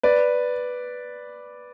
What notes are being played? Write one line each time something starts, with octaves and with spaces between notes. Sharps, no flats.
B4 D5